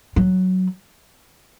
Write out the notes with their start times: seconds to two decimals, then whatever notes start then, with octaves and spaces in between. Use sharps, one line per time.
0.16 F#3